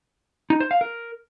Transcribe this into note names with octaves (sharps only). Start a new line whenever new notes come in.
D#4
C5
F5
A#4